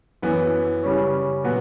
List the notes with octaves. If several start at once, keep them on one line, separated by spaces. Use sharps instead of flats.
F#2 E3 B3
C#3 G3 C#4
A#2 F#3 B3 F#4